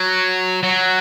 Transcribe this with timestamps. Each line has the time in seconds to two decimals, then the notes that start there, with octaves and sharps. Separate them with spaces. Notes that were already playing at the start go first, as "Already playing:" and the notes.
Already playing: F#3
0.63 F#3